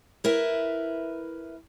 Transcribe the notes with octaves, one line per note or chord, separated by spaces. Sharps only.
E4 A#4 B4 E5